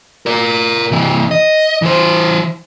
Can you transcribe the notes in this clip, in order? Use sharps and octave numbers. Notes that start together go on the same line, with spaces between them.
A#4 D5
C3 E3
D#5
E3 C5